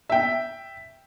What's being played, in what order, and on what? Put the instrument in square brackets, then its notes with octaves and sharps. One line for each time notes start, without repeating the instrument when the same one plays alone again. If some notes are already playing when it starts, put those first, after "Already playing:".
[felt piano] E5 G5